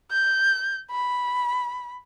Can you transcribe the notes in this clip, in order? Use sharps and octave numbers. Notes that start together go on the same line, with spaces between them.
G6
B5